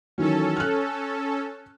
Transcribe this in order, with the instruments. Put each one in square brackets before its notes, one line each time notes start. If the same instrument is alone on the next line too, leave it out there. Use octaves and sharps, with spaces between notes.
[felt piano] D#3 E3 F#3 [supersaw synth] C#4 A4
[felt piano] F6 F#6